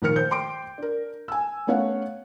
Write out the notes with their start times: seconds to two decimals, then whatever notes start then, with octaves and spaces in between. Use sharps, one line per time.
0.02 A#1 D#3 A#4 F6 C#7
0.16 C5 G6
0.31 G5 C6 D6 D7
0.78 D4 A#4
1.28 G#5 E6
1.67 A3 B3 C#4 C#5 F5 F#5